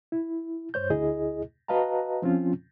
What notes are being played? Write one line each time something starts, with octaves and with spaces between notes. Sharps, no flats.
E4
G2 C5 C#5 G6
D2 E4 G#4 D#5
F#4 B4 D#5 F5 A5 A#5
F3 C4 C#4 F4